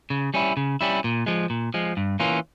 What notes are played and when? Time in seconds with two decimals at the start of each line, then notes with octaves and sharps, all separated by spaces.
0.10 C#3
0.34 G3 C#4 E4
0.57 C#3
0.81 G3 C#4 E4
1.04 A#2
1.26 F3 G#3
1.50 A#2
1.74 F3 G#3
1.97 G2
2.20 E3 A#3 C#4 F4